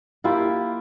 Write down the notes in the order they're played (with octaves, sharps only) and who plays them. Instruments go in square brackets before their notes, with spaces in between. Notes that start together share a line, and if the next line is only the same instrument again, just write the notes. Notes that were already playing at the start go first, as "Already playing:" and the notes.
[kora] A#3 E4 F4 G4